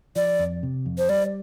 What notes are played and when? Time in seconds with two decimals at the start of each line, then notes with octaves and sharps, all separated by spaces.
0.16 F3 D5
0.39 F2
0.63 C3
0.86 F2
0.98 C5
1.09 G3 D5